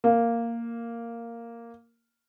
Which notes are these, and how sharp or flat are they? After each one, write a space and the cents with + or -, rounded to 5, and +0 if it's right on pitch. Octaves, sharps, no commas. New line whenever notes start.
A#3 -5